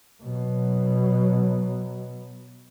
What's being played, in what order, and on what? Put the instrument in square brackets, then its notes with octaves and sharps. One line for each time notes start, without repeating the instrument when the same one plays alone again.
[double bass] B2 F#3